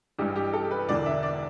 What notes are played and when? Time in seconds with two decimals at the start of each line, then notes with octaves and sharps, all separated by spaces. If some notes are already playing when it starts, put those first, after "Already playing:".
0.19 A1 G2 E3 G4
0.36 G4
0.53 A4
0.71 B4
0.88 E1 E2 D3 D5
1.06 E5
1.23 D5